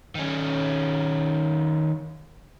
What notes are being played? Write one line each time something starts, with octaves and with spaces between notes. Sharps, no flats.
D#3 C#4